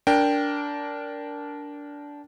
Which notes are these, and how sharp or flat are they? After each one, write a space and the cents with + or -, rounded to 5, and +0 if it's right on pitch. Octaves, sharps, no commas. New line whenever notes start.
D4 -15 A#4 +0 G5 +0